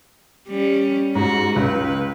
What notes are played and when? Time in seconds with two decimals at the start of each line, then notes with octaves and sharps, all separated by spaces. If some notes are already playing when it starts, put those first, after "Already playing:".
0.48 G3 C#4
1.15 G#2 F#4
1.56 C#2 B4